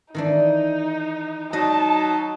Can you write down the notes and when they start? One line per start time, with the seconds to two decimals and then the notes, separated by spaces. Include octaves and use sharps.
0.15 D#3 E3 D4 D#4
1.53 F#3 D#4 D#5 A5